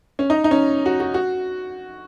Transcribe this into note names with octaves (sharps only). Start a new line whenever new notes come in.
C#4
D#4
D#4
C#4
F#4
F#4
F#4